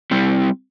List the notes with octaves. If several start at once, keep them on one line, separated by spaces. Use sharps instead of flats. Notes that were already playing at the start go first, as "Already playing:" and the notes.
G3 C4 E4